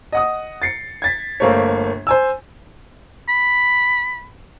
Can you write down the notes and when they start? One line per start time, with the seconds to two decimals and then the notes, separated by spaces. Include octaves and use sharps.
0.12 D#5 F#5 D#6
0.62 A6 C7 C#7
1.02 G#6 A6 B6
1.40 G1 A3 A#3 C5 C#5
2.07 C5 G#5 E6
3.29 B5